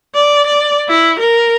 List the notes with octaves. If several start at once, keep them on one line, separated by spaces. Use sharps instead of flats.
D5
D5
E4
A#4